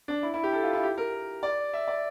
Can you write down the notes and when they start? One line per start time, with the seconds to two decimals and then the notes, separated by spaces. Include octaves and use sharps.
0.08 D4
0.23 E4
0.34 E4
0.44 G4
0.53 A4
0.63 F4
0.73 E4
0.83 G4
0.98 A#4
1.43 D5
1.74 E5
1.88 D5